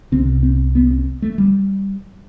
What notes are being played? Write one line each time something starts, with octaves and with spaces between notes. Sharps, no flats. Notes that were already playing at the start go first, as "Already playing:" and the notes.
C2 C3 C4
C4
B3
C4
A3
G3